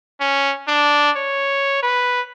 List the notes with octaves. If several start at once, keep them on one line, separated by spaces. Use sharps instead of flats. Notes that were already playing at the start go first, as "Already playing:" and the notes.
C#4
D4
C#5
B4